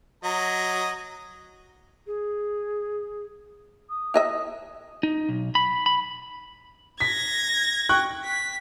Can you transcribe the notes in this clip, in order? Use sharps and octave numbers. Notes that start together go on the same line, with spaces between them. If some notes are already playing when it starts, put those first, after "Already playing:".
F#3 D#5 A#5
G#4
D#6
E4 D#5 E5
D#4
B1
B5
B5
G#6 A#6 B6
G5 C#6 F#6
B6